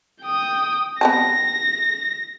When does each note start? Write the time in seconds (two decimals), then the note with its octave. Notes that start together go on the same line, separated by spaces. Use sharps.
0.23 G5 D#6
1.01 B3 C4 A5 A#6